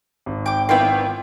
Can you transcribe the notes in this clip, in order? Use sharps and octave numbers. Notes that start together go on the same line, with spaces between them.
G#1
G5 D6
D#3 B3 E4 F4 D5 G5